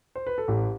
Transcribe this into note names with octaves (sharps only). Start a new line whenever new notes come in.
C5
B4
A4
A1 G4